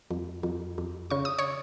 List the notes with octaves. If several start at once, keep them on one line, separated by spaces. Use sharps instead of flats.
F2
F2
F2
C#3 C#6
D#6
C#5 C#6